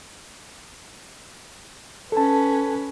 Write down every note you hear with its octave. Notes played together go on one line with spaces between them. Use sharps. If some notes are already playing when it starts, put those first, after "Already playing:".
C#4 A4 B4 A5